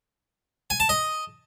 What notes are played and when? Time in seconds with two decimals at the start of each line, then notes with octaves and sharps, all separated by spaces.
0.70 G#5
0.80 A5
0.89 D#5